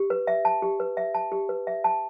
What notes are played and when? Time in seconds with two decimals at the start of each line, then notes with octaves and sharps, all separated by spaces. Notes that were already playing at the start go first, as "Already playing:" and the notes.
Already playing: G4
0.10 B4
0.27 E5
0.45 A5
0.62 G4
0.80 B4
0.97 E5
1.14 A5
1.32 G4
1.49 B4
1.67 E5
1.84 A5